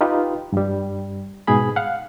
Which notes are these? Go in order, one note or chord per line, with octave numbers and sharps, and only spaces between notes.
D#4 F4 G4 B4
G2 G3
G#2 B2 G#4 B5
F5 F#5